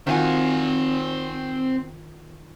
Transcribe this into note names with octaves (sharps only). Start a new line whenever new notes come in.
D#3 C4 F4 F#4 G#5